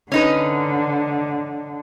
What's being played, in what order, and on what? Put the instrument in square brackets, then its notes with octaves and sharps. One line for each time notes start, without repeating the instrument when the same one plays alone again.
[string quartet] D3 [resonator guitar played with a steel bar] C#4 D#4 B4